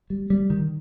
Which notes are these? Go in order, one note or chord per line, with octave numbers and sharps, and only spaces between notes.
G3
G3
D#3